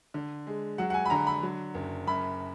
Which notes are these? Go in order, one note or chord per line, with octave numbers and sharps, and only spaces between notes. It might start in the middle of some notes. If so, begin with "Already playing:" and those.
D3
G#3
F#3 F#5
F#5
G#5
B5
D3 A#5
B5
F#3
F#1
F#2 B5